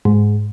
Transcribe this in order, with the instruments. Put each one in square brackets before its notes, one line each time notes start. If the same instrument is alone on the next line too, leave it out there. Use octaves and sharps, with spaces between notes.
[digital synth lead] G#2